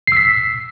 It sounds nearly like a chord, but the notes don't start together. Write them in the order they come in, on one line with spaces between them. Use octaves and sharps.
C7 E6 B6